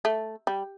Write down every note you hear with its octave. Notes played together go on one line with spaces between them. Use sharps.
A3
G3